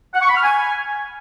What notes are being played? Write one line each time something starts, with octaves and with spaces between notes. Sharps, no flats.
F#5
C#6
B5
F6
G#5